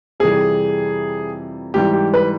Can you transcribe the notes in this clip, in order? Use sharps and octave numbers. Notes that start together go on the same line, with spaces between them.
F2 C3 E3 G3 G#4
G#2 E3 G3 G4
G4
B4